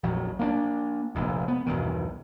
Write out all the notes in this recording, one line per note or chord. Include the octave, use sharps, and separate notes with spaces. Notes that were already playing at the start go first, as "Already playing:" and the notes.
A#1 F2 F#3
A#3 C4 D4
F1 A#1 F2
B3
B1 E2 G2 D#3